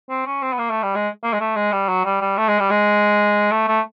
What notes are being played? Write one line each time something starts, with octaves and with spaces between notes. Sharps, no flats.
C4
C#4
C4
B3
A#3
A3
G3
G#3
A#3
G#3
A3
G#3
G3
F#3
G3
G3
A3
G#3
G3
G#3
A3
A3